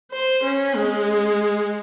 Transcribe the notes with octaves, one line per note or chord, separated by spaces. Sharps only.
C5
C#4
G#3